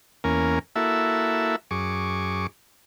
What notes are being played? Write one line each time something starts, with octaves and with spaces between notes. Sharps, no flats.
E2 A#3 C#4 A#4 G#5
A#3 E4 F#4 A4 E5
F#2 G#4 C#6 D6